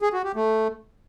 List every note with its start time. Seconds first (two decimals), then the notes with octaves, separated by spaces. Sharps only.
0.02 G#4
0.13 F#4
0.24 G4
0.36 A3